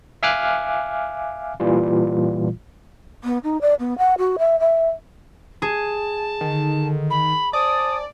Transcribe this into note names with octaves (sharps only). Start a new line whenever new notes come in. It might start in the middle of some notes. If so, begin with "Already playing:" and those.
E5 F5 G#5 D6 F6 F#6
A#2 E3 G3 F4
B3
D#4
D5
B3
F#5
F#4
E5
E5
G#4 A5
D3 D#3
B5
C5 D5 G#5 A5 D#6